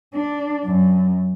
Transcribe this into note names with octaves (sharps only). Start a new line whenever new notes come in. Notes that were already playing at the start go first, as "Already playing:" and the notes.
D4
F#2